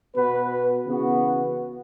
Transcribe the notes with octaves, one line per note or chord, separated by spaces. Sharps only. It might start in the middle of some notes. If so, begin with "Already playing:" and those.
B2 B3 F#4 B4
C#3 E3 B3 F#4